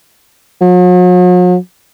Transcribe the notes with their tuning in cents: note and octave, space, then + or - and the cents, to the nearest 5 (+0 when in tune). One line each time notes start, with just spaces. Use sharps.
F#3 -45